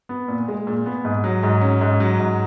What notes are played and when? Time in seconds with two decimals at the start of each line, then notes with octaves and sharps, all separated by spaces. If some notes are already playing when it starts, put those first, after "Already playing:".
0.09 B3
0.28 A#2
0.48 G#3
0.67 A#2
0.86 B3
1.05 G#2
1.24 F#3
1.43 G#2
1.61 C#4
1.81 G#2
2.00 F#3
2.19 G#2